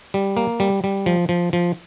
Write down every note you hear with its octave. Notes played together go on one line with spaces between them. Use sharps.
G3
A#3
G3
G3
F3
F3
F3